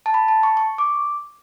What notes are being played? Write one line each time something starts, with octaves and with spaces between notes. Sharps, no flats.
A5
B5
A5
C#6
C#6
D6